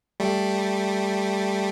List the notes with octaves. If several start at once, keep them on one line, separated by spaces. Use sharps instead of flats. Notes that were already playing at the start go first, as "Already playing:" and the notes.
G3 A3